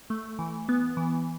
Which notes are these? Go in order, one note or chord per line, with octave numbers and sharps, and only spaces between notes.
A3
E3
B3
E3